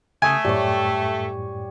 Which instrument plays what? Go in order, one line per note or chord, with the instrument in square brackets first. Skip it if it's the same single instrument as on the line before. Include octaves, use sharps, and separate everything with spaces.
[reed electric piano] C#3 D#6 [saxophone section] A3 [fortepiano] G#5
[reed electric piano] F#2 A2 [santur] G3 C#5